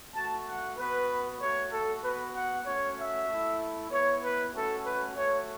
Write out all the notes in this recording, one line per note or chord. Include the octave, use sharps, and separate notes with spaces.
A3 F#4 A5
F#5
B3 F#4 B4
A3 F#4 C#5
A4
B3 F#4 B4
F#5
A3 C#4 F#4 C#5
E5
A3 E4
B3 E4 C#5
B4
A3 C#4 F#4 A4
B4
A3 F#4 C#5